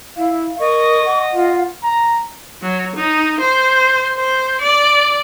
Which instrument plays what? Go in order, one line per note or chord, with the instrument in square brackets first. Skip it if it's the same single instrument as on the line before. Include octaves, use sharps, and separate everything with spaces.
[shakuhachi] E4 [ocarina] F5
[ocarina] A#4 [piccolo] D#5 [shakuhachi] C#6
[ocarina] F#5
[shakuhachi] F4
[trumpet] A#5
[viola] F#3
D#4
C5
C5
D5